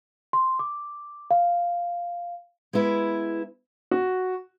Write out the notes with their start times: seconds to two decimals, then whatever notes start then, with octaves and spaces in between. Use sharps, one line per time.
0.33 C6
0.59 D6
1.31 F5
2.73 G#3 B3 E4 B4
3.91 F#4